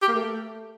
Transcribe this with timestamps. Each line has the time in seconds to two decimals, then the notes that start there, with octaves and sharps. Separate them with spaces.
0.02 G4
0.08 A#3
0.15 A3